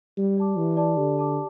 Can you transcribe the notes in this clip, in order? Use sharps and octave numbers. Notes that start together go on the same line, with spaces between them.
G3 G4
D5 A5 D6
E3 G4
D5 A5 D6
D3 G4
D5 A5 D6